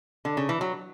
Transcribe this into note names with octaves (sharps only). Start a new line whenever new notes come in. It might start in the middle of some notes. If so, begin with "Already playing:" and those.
D3
C#3
E3
F#3